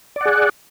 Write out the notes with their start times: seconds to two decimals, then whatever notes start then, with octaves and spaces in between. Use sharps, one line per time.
0.16 D5
0.21 F#5
0.25 G#4